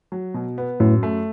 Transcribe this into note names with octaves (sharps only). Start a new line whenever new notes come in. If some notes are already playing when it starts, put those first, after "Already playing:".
F#3
B2
B3
F#2 A2
A3